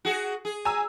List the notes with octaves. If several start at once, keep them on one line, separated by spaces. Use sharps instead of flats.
F#4 G#4
G#4
G#5 A#5 E6